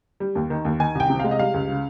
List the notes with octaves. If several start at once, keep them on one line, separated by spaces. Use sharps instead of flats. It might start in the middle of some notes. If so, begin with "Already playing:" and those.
G3
D#2
D#3
D#2
D#3 G#5
C2 G5
C3
G#3 F5
D#5
G3 F5
C#2
C#3